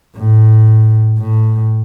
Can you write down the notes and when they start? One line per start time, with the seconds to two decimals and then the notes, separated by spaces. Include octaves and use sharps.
0.17 A2
1.18 A2